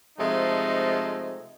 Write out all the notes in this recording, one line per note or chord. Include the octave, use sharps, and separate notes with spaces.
C3 F3 G#3 A3 D#4